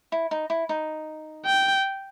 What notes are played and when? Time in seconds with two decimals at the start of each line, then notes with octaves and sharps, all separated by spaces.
0.12 E4
0.31 D#4
0.50 E4
0.69 D#4
1.46 G5